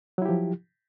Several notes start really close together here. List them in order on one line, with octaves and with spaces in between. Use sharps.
F#3 E4 G4 F3